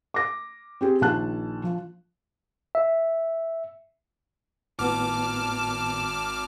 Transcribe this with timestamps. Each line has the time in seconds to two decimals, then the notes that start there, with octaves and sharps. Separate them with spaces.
0.14 D6 A#6
0.81 C4 G4 G#4
1.01 A#1 D#3 A5 F#6
1.64 F3
2.75 E5
4.79 G#1 A2 B3 A5 D6 F6